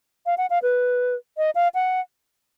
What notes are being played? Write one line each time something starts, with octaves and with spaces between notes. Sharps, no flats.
F5
F#5
F5
B4
D#5
F5
F#5